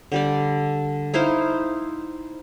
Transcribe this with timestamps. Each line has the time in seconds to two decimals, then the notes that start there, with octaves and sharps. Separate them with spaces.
0.12 D3 G3 D5
1.14 D#4 E4 C5 F5